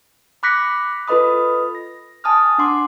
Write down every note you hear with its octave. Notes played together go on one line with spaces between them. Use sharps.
B5 D6 F#6 A#6 B6 C#7
F4 A4 B4 D#5 B5 D#6
A#6
G#5 A5 D#6 F6
D4 F#5 C6 D6